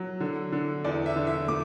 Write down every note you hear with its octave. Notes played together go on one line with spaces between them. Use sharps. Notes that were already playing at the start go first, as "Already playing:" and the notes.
Already playing: F#3
D3
D3
E2 D5
E5
D3
E5
A3 D6